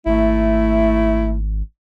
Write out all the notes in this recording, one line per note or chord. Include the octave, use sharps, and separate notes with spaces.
G#1 A3 E4